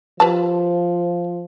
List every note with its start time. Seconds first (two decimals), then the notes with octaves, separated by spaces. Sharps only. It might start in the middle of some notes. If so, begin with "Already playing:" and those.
0.20 F3 G4 B4 A5